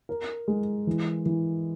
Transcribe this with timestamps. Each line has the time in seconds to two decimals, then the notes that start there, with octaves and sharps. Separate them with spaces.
0.09 A#4
0.48 G#3
0.87 E3
1.26 E3